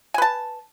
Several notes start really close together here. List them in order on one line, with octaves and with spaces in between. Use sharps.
G#5 B4 A5